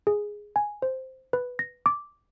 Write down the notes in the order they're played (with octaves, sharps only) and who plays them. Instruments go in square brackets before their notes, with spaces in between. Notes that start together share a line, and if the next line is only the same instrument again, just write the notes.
[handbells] G#4
G#5
C5
B4
A#6
D6